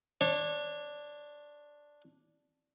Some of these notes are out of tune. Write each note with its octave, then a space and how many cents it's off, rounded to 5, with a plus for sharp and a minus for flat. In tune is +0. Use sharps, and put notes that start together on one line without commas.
D4 +0 C#5 -30